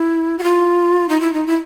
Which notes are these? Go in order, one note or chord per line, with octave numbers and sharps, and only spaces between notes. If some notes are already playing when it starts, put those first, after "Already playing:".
Already playing: E4
F#4
F4
D#4
E4
D#4
E4